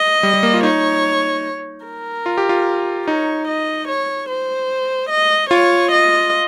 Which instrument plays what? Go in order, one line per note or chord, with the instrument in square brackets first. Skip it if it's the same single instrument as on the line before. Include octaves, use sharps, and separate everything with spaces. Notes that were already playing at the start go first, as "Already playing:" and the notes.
Already playing: [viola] D#5
[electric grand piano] G3
G3
A#3
F4
[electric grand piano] D#4 [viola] C#5
[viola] A#4
[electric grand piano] F4
G4
F4
[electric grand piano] D#4 [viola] C#5
[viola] D#5
C#5
C5
D#5
[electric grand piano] F4 [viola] C#5
[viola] D#5